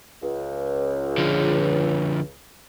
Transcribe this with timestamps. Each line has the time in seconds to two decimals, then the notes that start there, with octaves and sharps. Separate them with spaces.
0.22 C#2
1.18 D3 F3